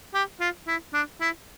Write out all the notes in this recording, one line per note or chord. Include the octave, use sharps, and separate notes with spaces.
G4
F4
E4
D4
E4